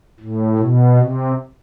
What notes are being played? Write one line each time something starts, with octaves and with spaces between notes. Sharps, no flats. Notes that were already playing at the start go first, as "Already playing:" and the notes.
A2
B2
C3